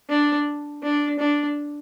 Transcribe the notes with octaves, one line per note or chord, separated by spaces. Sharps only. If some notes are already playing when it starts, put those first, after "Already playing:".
D4
D4
D4